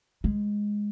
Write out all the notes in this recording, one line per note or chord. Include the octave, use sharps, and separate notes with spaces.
G#3